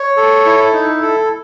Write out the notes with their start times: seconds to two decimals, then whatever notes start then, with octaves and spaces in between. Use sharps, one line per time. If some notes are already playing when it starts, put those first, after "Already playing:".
Already playing: C#5
0.17 A4
0.46 E4
0.73 D#4
1.02 A4